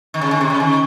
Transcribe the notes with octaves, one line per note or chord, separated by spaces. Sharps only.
D#3
C#3
D#3
C3
C#3
D#3